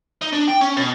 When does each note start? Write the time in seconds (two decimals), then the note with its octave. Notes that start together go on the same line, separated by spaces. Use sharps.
0.21 D#4
0.32 D4
0.48 G5
0.61 C#4
0.77 B2